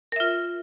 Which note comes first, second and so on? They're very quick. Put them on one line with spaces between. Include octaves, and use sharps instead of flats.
A#4 E5 F4